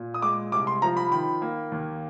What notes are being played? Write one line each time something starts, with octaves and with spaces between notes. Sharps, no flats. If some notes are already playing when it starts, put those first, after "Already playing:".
Already playing: A#2
D#6
G#3 D6
C2 D6
C6
F3 A#5
B5
D#3 B5
A#3
D#2